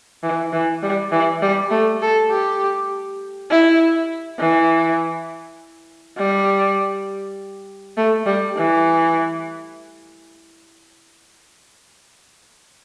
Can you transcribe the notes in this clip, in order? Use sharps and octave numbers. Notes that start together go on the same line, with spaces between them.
E3
E3
G3
E3
G3
A3
A4
G4
E4
E3
G3
A3
G3
E3